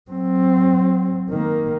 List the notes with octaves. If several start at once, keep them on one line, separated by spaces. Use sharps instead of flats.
F#3 C4
D#3 A#3